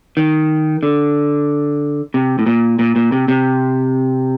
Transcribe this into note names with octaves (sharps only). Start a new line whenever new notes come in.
D#3
D3
C3
A2
A#2
A#2
A#2
C3
C3